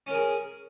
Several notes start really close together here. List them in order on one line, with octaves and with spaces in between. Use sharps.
C#4 A#4 G#4